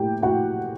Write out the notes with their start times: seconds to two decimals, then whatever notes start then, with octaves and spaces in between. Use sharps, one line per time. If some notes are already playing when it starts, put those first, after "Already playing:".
Already playing: A2 A#3 G4 G5
0.22 A2 F#4 F#5